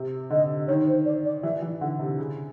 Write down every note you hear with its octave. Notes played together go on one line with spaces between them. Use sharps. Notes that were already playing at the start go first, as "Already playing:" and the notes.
Already playing: C3
D3 D#5
D#3 C#5
C5
D5
D5
E3 E5
E3
D3 F#5
C3
C#3